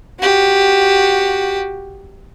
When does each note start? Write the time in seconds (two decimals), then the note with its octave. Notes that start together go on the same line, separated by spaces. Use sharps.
0.20 F#4 G4